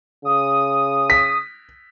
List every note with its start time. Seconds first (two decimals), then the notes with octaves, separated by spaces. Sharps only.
0.25 C#3 D#6
1.10 B6